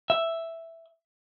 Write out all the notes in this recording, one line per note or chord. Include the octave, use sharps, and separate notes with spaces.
E5